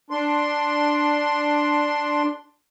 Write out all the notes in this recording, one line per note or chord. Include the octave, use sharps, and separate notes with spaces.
D4 C6